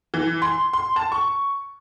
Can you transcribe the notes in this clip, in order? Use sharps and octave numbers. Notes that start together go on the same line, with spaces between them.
E3
C6
C6
A5
C#6